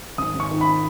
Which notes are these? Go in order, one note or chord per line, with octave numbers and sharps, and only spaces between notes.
G#1 D#6
G#1
C#6
D#3
B5